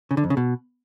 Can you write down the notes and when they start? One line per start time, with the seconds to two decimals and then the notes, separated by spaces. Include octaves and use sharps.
0.11 C#3
0.17 D3
0.24 F2
0.30 C#3
0.37 B2